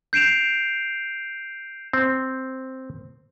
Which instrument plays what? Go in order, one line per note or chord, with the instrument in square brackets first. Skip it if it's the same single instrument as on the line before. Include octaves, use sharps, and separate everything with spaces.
[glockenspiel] G6 C7 D7 E7 F7
[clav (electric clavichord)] C4